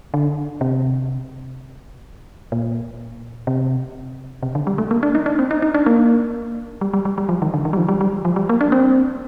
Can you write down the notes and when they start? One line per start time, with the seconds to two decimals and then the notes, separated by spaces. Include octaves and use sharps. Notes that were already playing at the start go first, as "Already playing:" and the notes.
0.14 D3
0.61 C3
2.52 A#2
3.47 C3
4.43 C3
4.55 D3
4.67 G3
4.78 A3
4.91 A#3
5.03 D4
5.15 D#4
5.26 D4
5.39 C4
5.51 D#4
5.62 D#4
5.74 D4
5.86 A#3
6.81 G3
6.93 G3
7.05 G3
7.18 G3
7.29 F3
7.42 D#3
7.54 D3
7.65 D#3
7.73 G3
7.77 F3
7.88 G3
8.01 G3
8.25 F3
8.36 G3
8.49 A#3
8.61 D4
8.72 C4